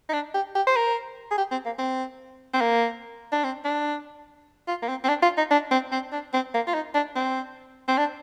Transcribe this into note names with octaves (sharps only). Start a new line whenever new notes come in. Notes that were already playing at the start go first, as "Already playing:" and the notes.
D#4
D4
G4
G4
C5
A#4
G#4
G4
C4
A#3
C4
C4
A#3
D4
C4
D4
F4
A#3
C4
C4
D4
F4
D#4
D4
C4
C4
D4
C4
A#3
F4
D#4
D4
C4
C4
D4